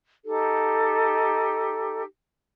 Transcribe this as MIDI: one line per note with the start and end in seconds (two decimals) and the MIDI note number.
0.25 2.01 63
0.25 2.01 67
0.25 2.01 69